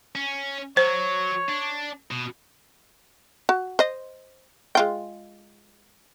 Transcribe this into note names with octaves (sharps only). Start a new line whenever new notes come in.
C#4
F#3 C5 C#5
D4
B2
F#4
C5 D#5
G#3 F4 G5